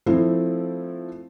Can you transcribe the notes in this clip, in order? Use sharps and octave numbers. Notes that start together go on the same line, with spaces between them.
F3 A3 C4 E4